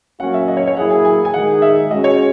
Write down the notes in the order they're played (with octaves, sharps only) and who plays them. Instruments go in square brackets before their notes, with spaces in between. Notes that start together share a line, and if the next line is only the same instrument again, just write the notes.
[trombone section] F#3 A#3 C#4 F#4 [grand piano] F#5
[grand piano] E5
D#5
C#5
C#5
[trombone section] F#3 A#3 E4 G#4 [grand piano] F#5
[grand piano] G#5
G#5
G#5
[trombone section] D#3 G#3 D#4 G#4 [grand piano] F#5
[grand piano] E5
[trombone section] G#3 C#4 F#4 [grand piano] D#5
[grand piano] C#5